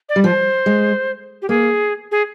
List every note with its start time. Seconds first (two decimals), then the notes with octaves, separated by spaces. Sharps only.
0.09 D5
0.16 G3
0.24 F3 C5
0.66 G#3
1.42 G4
1.49 A#3 G#4
2.11 G#4